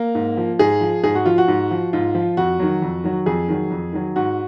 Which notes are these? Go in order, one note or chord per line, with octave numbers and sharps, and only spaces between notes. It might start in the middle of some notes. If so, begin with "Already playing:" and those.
Already playing: A#3
G#2
F3
G#2 G#4
F3
G#2 G#4
F#4
F3 F4
F#4
G#2
F3
G#2 F4
F3
F2 F#4
D#3 F#3
F2
D#3 F#3
F2 G#4
D#3 F#3
F2
D#3 F#3
G#2 F#4